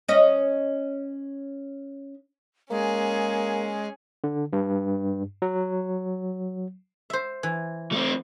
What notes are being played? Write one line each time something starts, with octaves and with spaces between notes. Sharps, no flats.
C#4 D#5
G#3 A#3 C#4 G#4
D3
G2
F#3
C5 E5
E3
A3 C4